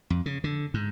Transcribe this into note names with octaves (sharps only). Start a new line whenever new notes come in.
F2
C#3
D3
G#2